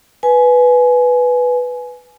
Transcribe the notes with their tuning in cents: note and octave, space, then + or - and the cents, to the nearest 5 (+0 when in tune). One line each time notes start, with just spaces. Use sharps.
B4 +0 G#5 +20